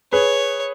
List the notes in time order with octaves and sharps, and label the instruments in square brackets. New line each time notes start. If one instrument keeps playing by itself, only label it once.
[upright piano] G#4 B4 [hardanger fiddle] C#5